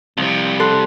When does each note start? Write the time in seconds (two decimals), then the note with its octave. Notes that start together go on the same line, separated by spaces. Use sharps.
0.17 C2 C3 F3
0.60 A4 C6 F#6